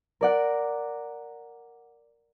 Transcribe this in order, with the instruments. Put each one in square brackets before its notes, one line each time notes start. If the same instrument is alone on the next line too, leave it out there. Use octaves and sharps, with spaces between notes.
[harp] A#4 D5 F#5